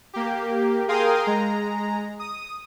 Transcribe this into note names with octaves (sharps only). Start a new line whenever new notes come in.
A#3 G4
G#4 A#4 F5 G5 C6 D#6
G#3 A#5
D#6